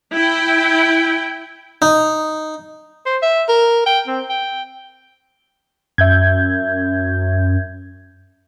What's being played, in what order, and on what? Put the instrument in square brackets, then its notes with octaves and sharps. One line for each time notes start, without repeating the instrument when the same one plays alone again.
[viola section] E4 G5
[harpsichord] D#4
[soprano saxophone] C5
E5
A#4
G5
C4
G5
[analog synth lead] F#2 [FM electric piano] E5 G6 G#6